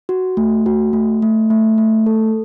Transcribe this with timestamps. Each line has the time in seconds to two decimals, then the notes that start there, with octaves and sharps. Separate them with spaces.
0.09 F#4
0.37 A3
0.66 F#4
0.93 A3
1.22 A3
1.50 A3
1.78 A3
2.06 A4